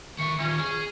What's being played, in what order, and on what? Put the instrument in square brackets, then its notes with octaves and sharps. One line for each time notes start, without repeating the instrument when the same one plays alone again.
[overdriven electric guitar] D#3 E5 [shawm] C#6
[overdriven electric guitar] D#3 F4 [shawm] C#4
[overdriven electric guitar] G#4